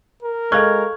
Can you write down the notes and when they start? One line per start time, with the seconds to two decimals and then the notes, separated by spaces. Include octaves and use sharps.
0.23 A#4
0.52 G#3 A4 F5 C#6 F6 F#6 G#6